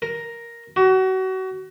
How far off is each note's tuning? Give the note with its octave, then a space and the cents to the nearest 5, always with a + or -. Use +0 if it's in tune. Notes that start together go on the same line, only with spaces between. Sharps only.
A#4 +5
F#4 +30